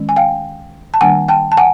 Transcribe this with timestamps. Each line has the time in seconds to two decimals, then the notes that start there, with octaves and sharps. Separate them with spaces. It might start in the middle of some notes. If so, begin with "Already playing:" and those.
Already playing: D#3 G#3 C#4
0.09 G#5
0.16 F5 G5
0.94 A5
1.01 D#3 G3 A#3 D4 F#5 G#5
1.28 G5 A5
1.52 A5
1.57 F#5 G#5